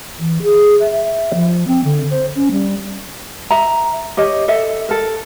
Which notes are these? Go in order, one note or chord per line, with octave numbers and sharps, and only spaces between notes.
E3
G#4
E5
E5
F3
C4
D3
C5
C#4
G3
E5 A#5
G4 C#5 D#5
A4 D#5 E5
A4 A#4